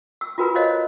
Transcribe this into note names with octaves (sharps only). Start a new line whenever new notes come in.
E6
F4 F#4 A#4 B4 G#5 A#5
A#4 C5 C#5 D#5 F5